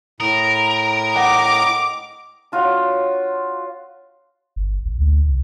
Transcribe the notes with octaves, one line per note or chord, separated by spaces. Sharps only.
A2 A#4 A#5 D#6
D#5 F#5 G5 D6
D4 F4 F#4 C#5
G1
A#1
D2
C2